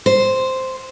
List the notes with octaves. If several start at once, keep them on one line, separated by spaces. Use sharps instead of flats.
C5